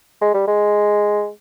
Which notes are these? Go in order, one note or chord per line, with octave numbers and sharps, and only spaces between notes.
G#3
G3
G#3